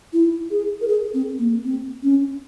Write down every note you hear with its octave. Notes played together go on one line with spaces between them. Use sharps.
E4
G#4
A#4
G#4
C4
A#3
C4
C#4